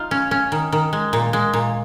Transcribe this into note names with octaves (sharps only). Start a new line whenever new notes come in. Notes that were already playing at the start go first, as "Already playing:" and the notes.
Already playing: D#4 F4
C#4
C#4
D#3
D#3
G#3
A#2
G#3
A#2